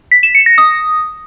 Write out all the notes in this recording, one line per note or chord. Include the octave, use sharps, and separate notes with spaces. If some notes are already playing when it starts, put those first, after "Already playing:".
B6
E7
C#7
A#6
D#6